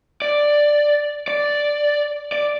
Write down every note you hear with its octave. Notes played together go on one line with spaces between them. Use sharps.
D5
D5
D5